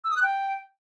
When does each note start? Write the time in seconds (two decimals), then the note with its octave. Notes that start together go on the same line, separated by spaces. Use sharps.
0.04 E6
0.10 D#6
0.17 F#6
0.23 G5